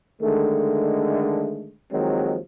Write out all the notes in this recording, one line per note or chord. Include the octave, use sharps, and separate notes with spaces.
D3 D#3 G#3 A3
D#2 D#3 F3 F#3 G#3 C4